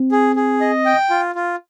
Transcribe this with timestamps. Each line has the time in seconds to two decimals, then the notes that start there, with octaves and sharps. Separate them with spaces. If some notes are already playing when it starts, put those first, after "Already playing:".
Already playing: C4
0.12 G#4
0.36 G#4
0.61 D#5
0.86 G5
1.10 F4
1.35 F4